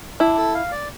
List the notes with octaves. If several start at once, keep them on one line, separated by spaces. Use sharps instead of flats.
D4 E4
A4
F5
D5